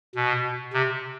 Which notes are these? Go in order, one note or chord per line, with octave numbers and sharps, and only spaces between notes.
B2
C3